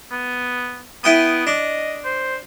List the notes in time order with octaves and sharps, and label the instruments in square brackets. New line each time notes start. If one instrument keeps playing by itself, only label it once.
[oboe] B3
[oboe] B3 [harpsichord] E4 G5 D#6
[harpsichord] D4 [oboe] D#5
[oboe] C5